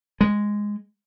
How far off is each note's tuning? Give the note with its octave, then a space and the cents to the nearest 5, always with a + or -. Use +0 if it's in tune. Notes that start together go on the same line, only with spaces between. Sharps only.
G#3 -5